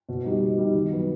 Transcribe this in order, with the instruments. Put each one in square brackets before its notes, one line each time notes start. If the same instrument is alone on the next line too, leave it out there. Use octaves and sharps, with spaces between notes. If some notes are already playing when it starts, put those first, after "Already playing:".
[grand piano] B2
G3 D#4
B2
G3 D#4
D#3
F#3 B3